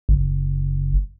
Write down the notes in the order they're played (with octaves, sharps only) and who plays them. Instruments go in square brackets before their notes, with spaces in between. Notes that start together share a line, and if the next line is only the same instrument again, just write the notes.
[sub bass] F#1